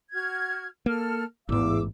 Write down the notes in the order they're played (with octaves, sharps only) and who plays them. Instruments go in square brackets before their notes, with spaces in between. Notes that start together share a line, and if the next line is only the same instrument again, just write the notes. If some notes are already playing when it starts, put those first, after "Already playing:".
[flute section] F#4 F6 G#6
[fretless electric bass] A#3 [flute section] A4 F6
[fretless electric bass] A1 G#2 [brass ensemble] E2 [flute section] F5 D6 E6